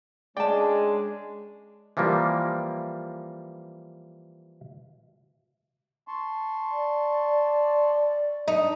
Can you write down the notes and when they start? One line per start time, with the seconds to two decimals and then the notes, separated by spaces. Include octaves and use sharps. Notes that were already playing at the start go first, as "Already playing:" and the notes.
0.37 G#3 C#4 D4 G#4 D5 G5 A5
1.97 E3 F3 G3 A#3
6.08 A5 C6 C#6
6.72 D5
8.48 D4 D#4